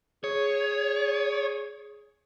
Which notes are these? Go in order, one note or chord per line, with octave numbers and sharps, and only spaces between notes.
G#4 C#5